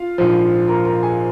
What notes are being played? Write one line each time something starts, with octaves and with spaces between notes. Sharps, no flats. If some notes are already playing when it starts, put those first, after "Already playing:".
Already playing: F4 F5
A#1 G#2 F3
A#4 A#5
A#4 A#5
G#4 G#5